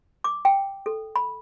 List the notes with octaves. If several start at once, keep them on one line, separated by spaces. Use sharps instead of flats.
D6
G5
A4
B5